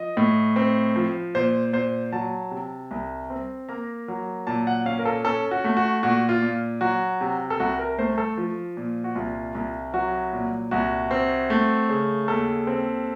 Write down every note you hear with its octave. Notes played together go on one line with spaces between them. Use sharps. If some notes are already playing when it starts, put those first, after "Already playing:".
Already playing: F3 D#5
A2
C4
F3
A#2 C5
A#2 C5
F#3 A5
C3
C2
C4
A#3 A#5
F#3
A#2 A5
F#5
C#4 F5
A#4
A4
C#4 A4
F#4
A3
F#4
A#2 F#4
F4
A#2
F#3 F#4
C3
A4
C2 F#4
A#4
A3 C5
A4
F3
A#2
F#4
C2 F4
C2
F#3 F#4
A#2
C2 F#4
C4
A3
C#3
D#2 A4
C4